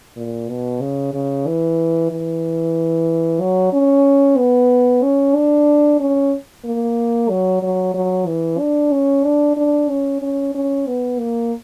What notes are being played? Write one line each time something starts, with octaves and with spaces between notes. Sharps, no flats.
A#2
B2
C#3
C#3
E3
E3
F#3
C#4
B3
C#4
D4
C#4
A#3
F#3
F#3
F#3
E3
D4
C#4
D4
D4
C#4
C#4
C#4
B3
A#3